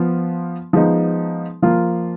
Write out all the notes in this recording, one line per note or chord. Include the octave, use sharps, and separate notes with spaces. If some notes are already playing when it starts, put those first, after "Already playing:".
Already playing: F3 B3 F4
F3 G#3 B3 D#4
F3 A#3 F4